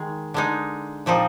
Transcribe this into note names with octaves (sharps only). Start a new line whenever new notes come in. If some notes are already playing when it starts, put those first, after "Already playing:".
Already playing: D#3 G#3
D3 G#3 D#4
A#2 F3 C4 D#4